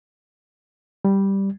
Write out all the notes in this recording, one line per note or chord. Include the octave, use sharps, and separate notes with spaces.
G3